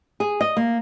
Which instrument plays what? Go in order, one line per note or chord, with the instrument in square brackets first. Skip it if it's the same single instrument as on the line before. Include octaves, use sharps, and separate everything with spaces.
[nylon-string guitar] G#4
D#5
A#3